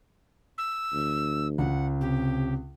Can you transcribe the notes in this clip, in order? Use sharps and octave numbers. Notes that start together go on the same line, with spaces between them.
E6
D2
C#2 F#5
C3 G4